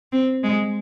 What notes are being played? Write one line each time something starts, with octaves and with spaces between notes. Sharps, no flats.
C4
G#3